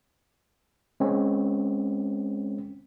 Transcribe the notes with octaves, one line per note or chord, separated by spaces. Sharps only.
G#3 C4 C#4